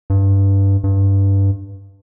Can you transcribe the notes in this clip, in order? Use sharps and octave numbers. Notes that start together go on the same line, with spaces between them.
G2
G2